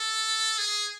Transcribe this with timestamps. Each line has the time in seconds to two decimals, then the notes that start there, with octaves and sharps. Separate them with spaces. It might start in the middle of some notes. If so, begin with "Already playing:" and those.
Already playing: A4
0.58 G#4